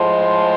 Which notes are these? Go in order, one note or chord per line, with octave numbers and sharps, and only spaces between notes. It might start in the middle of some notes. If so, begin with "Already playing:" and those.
Already playing: A2 F3 G#3